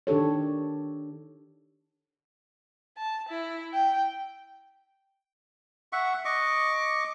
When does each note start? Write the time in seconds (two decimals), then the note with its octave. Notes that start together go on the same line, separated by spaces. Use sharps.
0.07 D#3 D4 G4 A4 C#5
2.98 A5
3.29 E4
3.74 G5
5.93 E5 F#5 C#6
6.25 D#5 C#6 D6